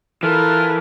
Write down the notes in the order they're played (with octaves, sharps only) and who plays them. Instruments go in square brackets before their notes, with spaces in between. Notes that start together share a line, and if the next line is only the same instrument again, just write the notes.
[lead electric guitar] E3 [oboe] F4 [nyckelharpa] A4 A#4